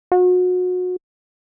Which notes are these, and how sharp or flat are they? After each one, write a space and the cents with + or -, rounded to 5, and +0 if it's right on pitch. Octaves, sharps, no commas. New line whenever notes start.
F#4 -30